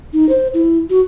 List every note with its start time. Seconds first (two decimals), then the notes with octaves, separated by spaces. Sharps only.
0.13 D#4
0.29 C5
0.54 E4
0.90 F#4